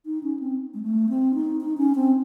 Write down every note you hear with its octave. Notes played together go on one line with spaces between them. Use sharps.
D#4
C#4
C4
G#3
A3
C4
D#4
D#4
C#4
C4